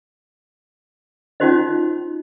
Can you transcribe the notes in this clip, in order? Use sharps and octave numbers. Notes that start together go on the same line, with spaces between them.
C#4 D#4 F4 F#4 C5 D#5